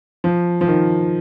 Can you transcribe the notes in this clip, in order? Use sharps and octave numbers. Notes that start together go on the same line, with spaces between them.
F3
F3
D#3